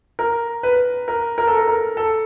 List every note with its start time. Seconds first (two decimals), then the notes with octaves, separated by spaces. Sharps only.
0.19 A#4
0.63 B4
1.08 A#4
1.38 A#4
1.47 A4
1.57 A#4
1.67 A#4
1.97 A4